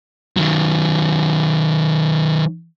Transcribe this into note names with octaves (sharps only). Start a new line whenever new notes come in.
D#3 F#3